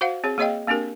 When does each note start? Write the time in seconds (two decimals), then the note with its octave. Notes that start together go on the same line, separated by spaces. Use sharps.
0.01 F#4 C5 F5 F#5
0.24 C4 G#4 C#5
0.38 A#3 G#4 C#5 D#5 F5 G5
0.67 A#3 C4 D4 G4 A#4